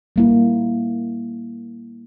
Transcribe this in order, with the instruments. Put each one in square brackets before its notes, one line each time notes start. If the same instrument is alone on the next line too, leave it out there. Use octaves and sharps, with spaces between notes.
[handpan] G3 A#3 E4